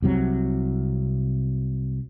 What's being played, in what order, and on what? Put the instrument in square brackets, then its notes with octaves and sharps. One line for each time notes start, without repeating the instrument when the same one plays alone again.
[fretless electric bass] C2 C3 F#3